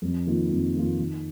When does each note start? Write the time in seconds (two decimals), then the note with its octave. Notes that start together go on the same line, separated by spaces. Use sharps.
0.02 F2
0.27 D#3 A#3 F4
0.50 F2
0.74 D#3 A#3 F4
0.98 D#3